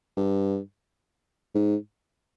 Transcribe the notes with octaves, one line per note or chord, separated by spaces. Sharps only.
G2
G#2